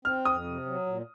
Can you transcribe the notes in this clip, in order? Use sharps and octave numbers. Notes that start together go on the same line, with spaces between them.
C4 F6
F2 D#6
C3
F#3
A#2